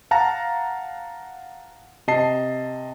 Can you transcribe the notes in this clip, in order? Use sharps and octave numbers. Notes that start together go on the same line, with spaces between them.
F5 F#5 A5 A#5 A#6
C3 D#5 A5 C7